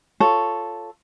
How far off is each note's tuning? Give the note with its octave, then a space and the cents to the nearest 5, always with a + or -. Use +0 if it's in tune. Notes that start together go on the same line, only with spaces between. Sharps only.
F4 +0 A4 +0 C#5 +0